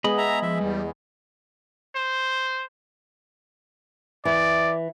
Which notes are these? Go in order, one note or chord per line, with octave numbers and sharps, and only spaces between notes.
G#3 B3 G#4 D#5 B5
E5 A#5
F3 E5
E2 G3
C5
E3 D5